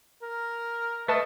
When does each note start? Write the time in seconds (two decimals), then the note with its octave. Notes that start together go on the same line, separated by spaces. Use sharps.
0.22 A#4
1.08 A3 B4 D#5 A5